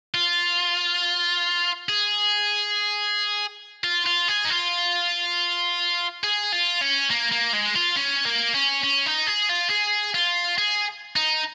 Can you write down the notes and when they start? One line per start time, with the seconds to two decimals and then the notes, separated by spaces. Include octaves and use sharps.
0.14 F4
1.89 G#4
3.84 F4
4.06 F4
4.28 G#4
4.45 D#4
4.50 F4
6.23 G#4
6.52 F4
6.81 C#4
7.10 A#3
7.32 A#3
7.53 G#3
7.76 F4
7.96 C#4
8.25 A#3
8.54 C#4
8.84 C#4
9.06 D#4
9.27 G#4
9.49 F4
9.70 G#4
10.14 F4
10.58 G#4
11.16 D#4